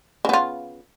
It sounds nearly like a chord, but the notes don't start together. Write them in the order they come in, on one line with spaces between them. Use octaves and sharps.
C#3 B3 F4